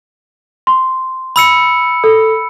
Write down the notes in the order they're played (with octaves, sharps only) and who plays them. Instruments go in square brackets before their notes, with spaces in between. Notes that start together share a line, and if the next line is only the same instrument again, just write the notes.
[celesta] C6
[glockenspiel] B5 E6 C#7
[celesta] A4